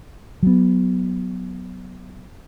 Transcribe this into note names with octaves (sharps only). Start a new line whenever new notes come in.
F#3 B3